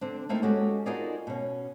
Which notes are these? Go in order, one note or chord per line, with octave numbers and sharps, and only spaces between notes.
D3 C4 D4
G3 A3 A#3 C4 D#4 E4
G#3 C#4 D#4 F#4 G4 A4
D#4 F4 F#4 G#4 A#4 D5
B2 C#4